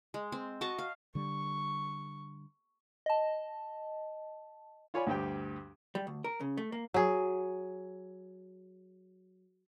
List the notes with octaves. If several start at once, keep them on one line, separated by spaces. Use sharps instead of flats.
G#3
C4
F#4 D#5 A5 C#6
F5
D3 G3 C#6
D#5 A5
F4 C#5 D5 G#5 B5
D2 G2 G4 G5
G3
D2
A#4
C#3
A3
A#3
F#3 G#4